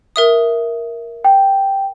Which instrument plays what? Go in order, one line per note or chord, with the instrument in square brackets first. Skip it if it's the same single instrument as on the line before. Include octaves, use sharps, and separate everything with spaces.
[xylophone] A#4 E5 D#6
[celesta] G5